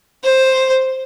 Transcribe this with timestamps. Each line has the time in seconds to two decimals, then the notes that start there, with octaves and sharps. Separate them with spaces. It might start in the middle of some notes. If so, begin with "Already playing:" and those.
0.24 C5